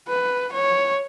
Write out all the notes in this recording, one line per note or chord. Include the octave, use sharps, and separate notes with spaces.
B4
C#5